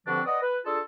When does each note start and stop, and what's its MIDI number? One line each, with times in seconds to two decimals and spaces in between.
0.07 0.22 43
0.07 0.22 50
0.07 0.22 53
0.07 0.22 60
0.07 0.22 62
0.07 0.22 66
0.26 0.41 71
0.26 0.41 74
0.26 0.41 75
0.26 0.41 78
0.26 0.41 87
0.43 0.59 71
0.66 0.80 62
0.66 0.80 65
0.66 0.80 68
0.66 0.80 69